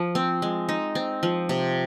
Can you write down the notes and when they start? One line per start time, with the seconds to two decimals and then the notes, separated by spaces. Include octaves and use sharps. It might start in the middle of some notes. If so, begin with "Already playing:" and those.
Already playing: F3
0.15 C4
0.42 G#3
0.69 D#4
0.95 C4
1.23 F3
1.49 C3